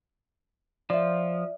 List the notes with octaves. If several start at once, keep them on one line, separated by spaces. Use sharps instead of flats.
F3 D5 E5